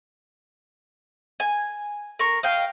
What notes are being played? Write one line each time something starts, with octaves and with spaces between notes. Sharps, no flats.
G#5
A#4 C#6
D#5 F5 G5